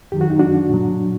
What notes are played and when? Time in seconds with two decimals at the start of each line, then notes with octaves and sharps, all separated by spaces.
0.12 F#2 D#3 F#3 G4
0.21 F#4
0.30 D#4
0.39 D4 F#4
0.70 A#2 F#3